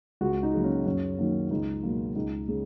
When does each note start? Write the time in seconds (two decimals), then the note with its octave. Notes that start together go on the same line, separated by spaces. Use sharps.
0.21 C#2 F#4
0.43 D#4
0.53 C#3 F#3 A#3
0.64 C#4
0.86 F#2 C#4
1.18 D#3 F#3 A#3
1.51 C#2 D#4
1.83 B2 F#3 A#3
2.15 C#2 D#4
2.48 C#3 G#3